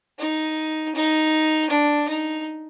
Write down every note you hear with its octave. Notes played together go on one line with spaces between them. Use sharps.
D#4
D#4
D4
D#4